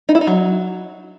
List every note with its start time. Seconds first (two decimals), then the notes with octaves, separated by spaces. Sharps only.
0.09 D#4
0.15 E4
0.21 D#4
0.27 F#3